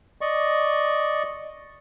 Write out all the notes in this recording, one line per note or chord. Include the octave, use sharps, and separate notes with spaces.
D5 D#5 C#6